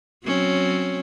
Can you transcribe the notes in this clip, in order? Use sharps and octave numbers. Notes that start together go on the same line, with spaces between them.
F#3 C4 C#4